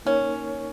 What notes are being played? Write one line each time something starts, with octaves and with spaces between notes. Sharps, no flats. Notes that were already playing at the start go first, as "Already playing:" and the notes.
A#3 C#4 D#4 A#4 C#5